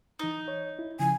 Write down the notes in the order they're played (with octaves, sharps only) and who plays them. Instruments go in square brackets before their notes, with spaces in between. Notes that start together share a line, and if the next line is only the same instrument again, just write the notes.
[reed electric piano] E3 D#6 [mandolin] D#4
[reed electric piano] C#5
E4
[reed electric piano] C#3 F3 [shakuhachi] G#5